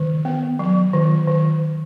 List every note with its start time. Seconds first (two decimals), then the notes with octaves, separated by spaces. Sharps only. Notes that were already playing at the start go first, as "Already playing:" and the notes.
Already playing: D#3
0.25 B3
0.59 F#3
0.93 D#3
1.28 D#3